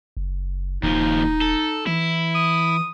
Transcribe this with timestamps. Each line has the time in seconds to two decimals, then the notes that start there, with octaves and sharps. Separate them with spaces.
0.17 F#1
0.83 D#1 D#2 F3 D#4
1.42 A4
1.87 E3 E4
2.35 D#6